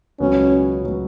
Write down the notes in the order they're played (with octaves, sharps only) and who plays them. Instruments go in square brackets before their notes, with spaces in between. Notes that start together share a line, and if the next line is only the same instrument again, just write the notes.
[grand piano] C#2 B2 F#3 B3 [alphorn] C#4
[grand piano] B2 F#3 B3